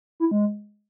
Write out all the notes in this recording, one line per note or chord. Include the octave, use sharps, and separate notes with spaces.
E4
G#3